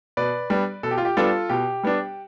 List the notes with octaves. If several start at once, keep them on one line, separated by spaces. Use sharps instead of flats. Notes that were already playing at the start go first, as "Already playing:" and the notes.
B2 B4 D5
G3 B3 D4
B2 A4
G4
F4
G4
G3 B3 D4 F4 A4
B2 G4
G3 B3 D4